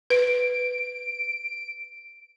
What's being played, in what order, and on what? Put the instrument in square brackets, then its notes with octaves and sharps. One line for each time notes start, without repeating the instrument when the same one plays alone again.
[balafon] B4 [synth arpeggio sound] D7